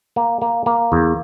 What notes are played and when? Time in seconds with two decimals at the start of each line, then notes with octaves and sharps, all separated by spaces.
0.16 A#3
0.42 A#3
0.66 A#3
0.92 E2